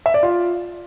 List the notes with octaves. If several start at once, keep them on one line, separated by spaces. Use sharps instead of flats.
E5
D5
F4